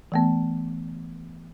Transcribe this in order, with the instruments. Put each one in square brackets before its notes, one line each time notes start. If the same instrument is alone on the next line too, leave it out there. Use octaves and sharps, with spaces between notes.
[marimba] E3 A3 B3